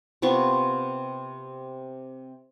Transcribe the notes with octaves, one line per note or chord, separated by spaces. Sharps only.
C3 B3 F4 C#6